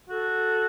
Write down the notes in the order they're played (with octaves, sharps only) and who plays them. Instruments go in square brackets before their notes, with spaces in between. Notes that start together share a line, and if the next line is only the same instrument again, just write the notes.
[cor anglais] F#4 [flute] A4